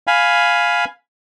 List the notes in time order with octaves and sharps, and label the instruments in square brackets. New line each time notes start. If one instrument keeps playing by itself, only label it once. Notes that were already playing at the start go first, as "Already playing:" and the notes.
[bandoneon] F5 G#5 B5